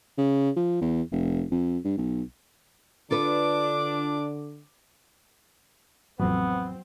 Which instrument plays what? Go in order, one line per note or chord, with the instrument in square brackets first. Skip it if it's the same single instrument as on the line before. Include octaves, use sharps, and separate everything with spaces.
[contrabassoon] C#3
F3
E2
F1
F2
G2
B1
[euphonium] D3 [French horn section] D4 [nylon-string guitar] F4 A4 B4 [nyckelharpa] D6
[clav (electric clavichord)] A1 F2 [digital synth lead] F#3 [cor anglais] B3 [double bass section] C4